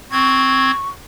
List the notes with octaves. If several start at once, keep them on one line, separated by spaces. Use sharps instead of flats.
C4 C#6 G#6